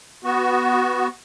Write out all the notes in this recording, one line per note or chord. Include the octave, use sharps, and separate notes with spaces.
B3 F#4